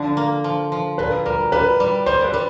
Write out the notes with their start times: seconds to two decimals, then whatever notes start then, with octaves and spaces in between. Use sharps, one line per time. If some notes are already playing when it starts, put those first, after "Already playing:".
Already playing: D3 F3
0.17 A#3
0.44 F3
0.72 F3
0.98 A#2 B4
1.26 G3 A#4
1.52 G3 B4
1.80 G3
2.06 G3 C5
2.24 B4
2.33 G3